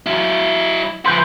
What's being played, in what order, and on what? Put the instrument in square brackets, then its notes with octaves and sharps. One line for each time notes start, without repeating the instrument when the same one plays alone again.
[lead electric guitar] F#3 E4
[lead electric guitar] F3 B4 [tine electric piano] C6 G6